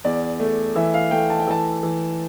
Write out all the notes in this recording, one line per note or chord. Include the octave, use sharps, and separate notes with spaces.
E2 D5
A3
E3 E5
F5
A3 G5
A5
G5
E3 A5
E3